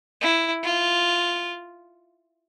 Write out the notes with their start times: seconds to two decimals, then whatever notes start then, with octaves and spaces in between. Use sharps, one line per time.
0.22 E4
0.63 F4